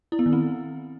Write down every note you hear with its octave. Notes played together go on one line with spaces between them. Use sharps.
E4
B3
D#3
C4